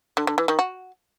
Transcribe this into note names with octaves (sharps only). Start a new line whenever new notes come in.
D3
D3
E3
D#3
F#4